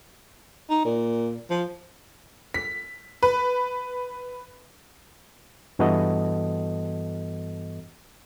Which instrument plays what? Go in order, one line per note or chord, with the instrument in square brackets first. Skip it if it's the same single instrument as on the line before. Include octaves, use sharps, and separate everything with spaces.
[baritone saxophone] D#4
A#2
F3
[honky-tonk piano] B6
B4
[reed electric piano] G2 E3 B3 F#4 A4 D#5